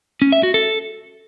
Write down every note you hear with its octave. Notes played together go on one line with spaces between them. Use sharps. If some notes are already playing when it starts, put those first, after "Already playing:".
C#4
E5
F#4
A4